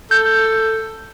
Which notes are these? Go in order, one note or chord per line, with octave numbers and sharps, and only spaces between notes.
A4 G6